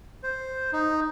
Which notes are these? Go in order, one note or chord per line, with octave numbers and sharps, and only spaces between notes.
C5
D#4